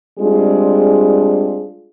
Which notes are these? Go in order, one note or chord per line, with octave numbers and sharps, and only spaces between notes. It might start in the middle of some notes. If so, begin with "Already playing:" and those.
G3 G#3 C4 D4 F4 G#4